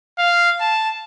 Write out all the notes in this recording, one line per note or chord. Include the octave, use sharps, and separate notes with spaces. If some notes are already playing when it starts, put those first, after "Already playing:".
F5
A5